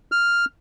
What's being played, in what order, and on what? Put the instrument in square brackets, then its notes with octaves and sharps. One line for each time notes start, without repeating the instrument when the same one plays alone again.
[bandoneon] F6